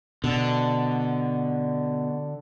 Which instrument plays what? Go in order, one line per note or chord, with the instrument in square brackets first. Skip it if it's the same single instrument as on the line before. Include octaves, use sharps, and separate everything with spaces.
[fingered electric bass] B2 [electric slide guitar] D3